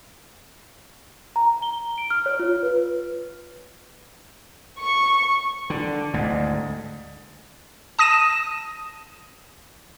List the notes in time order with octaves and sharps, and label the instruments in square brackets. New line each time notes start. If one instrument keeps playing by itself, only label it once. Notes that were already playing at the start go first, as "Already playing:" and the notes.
[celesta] A#5
G7
D7
F6
C#5
F4
B4
[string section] C#6
[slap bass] D3
D2 G#2
[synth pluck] A5 D#6 A#6 D#7 E7